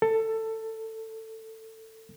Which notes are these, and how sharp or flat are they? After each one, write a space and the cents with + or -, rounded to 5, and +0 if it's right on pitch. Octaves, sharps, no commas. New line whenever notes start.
A4 +15